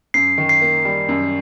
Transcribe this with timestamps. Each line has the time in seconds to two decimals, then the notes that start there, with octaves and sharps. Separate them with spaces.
0.14 F#2 C7
0.38 D#3
0.49 C7
0.62 A#3
0.85 G3
1.09 F#2